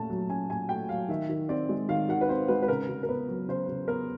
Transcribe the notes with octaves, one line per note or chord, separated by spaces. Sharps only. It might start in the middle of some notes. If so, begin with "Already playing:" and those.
Already playing: A#2 A3 C#4 A5
F#3
C#4 G#5
A#2 G#5
A3 G5
F#3 F5
D#3 E5
D#3
C4 D5
G#3
D#3 F5
D#3 F#5
B4
C4 C5
G#3 B4
B4
C#3 A#4
C#3
A#4
B3 B4
F#3
C#3 C5
C#3
B3 A#4